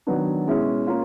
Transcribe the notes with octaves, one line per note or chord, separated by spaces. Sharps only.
D#3 F#3 B3 D4
B2 G#3 C#4 E4
A#3 C#4 F4